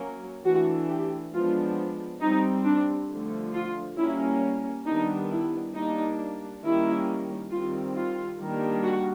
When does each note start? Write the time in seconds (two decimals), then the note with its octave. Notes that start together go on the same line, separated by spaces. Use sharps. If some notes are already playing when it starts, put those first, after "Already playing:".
Already playing: F#3 A#3 C#4
0.44 E3 A3 D4 F#4
0.88 G4
1.33 F3 G#3 B3 D4 F4
2.21 G3 C4 D#4
2.65 D4
3.09 D3 F3 A3
3.54 F4
3.97 G3 A#3 C#4 E4
4.86 D#3 G3 B3 D4 D#4
5.30 E4
5.74 G3 A#3 D4 D#4
6.62 D#3 G3 A#3 C#4 E4
7.51 D#3 G3 C4 F4
7.95 F4
8.40 D#3 G3 A#3 D4
8.83 F#4